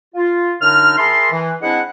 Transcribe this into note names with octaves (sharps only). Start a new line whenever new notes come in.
F4
F#2 D3 D4 D#4 F6
G#4 A#4 E5 A5 B5 C6
E3
G#3 C4 D4 E4 C5 F#5